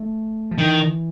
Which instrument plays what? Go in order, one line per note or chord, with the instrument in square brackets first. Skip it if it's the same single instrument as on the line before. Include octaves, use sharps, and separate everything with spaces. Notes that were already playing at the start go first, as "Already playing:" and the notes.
Already playing: [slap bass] A3
F3
[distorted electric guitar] D#3 [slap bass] E3